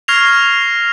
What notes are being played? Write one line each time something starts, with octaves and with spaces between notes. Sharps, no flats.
C#6 F6 G#6 A#6 C7 F7